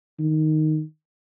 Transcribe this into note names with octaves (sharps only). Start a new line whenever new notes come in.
D#3